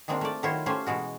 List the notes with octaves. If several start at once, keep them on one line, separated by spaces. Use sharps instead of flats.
D#3 G#3 A#3 C4 D4 F4
A3 D5
D#3 F#3 E4 F4 C5 C#5
A3 C#4 F4 G4 C5 G#5
B2 E3 G#3 F#4